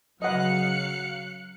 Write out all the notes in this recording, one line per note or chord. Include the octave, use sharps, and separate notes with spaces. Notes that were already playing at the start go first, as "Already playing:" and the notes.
C#3 F#3 D#5 F5 F#5 F#6 C#7